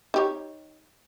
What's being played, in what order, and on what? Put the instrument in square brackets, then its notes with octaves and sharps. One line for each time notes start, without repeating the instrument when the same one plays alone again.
[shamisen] D#4 G4 C#5